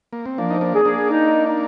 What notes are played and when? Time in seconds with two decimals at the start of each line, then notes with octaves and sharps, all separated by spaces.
0.13 A#3
0.26 C4
0.37 F3 A#3 D4
0.50 D#4
0.61 A#3 D4
0.74 G#4
0.85 A#3 D4
1.10 D#4
1.46 D#4